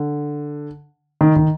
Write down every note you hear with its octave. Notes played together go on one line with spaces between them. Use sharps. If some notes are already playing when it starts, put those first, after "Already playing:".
Already playing: D3
D#3
D#3